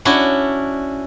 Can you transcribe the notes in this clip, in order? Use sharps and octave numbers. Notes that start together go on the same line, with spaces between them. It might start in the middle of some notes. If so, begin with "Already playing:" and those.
C#4 D4 E4 F#4